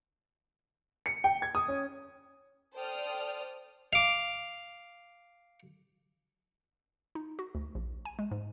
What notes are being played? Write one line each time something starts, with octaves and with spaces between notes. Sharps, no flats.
C#7
G5
G#6
D#6
C#4
A4 C5 D5 G5 D#6 F6
F5 D6
D#4
F#4
D2
A#1
G#5
G#3
G#2